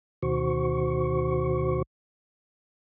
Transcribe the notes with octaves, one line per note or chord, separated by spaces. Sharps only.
D2 B2 D#3 F#4 C5 C#6